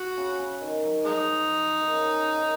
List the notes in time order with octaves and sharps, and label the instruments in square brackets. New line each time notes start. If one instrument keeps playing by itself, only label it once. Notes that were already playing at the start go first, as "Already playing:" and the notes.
Already playing: [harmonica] F#4
[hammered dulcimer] C#3
C#3
D#3
F#3
[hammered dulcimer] F3 [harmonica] G#3 D#4
[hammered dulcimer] D#3
C#3
D#3